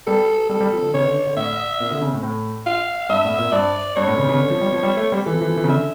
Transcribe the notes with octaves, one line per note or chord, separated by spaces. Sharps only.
G3 A4
G3 A4
G3
F3
D3
C#3 C#5
D3
D3
A2 E5
A#2
D3
C#3
A2
A2
F5
G2 E5
A2
A#2
G2 D5
G2 C#5
A2
C#3
C#3
D3
F3
G3
F3
G3
A3
G3
G4
E3 A4
F3
E3
F3
E3
C#3
D3 E5